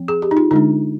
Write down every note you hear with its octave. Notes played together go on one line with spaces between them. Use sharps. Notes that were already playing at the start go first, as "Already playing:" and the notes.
Already playing: F3 C4
G#4
G4
D#4
F4
D3 G#3 D4 D#4